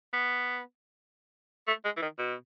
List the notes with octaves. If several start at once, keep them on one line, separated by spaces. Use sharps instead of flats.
B3
A3
G#3
E3
D#3
B2